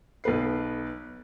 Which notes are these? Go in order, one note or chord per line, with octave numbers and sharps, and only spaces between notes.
B1 B3 B4 C7